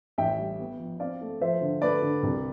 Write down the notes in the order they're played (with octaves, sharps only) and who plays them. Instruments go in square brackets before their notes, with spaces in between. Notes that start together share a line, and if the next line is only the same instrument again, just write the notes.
[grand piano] A1 E5 G5
G3
B3
F3
C4 D5 F5
A3
F3 C5 E5
D3
A3 B4 D5
D3
C2